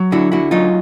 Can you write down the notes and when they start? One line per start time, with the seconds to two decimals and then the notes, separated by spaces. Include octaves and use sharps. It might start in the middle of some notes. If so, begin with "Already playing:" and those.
Already playing: F#3
0.12 D3 E4 F#4
0.32 D3 E4 F#4
0.51 F#3 D#4 F4